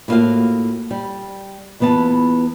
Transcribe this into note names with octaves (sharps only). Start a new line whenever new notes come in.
A2 G3 A#3 F4 F#4 F5
G3
E2 E3 B3 F4 A5